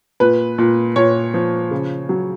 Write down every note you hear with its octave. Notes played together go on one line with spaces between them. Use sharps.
A#2 B4
A#2
A#2 C#5
F3
C#3
F#3